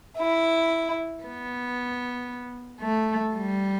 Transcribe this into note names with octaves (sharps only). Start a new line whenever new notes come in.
E4
B3
A3
G3